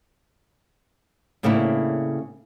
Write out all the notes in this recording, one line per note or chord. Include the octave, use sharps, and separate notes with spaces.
A2 C#3 A#3 C4 D4 E4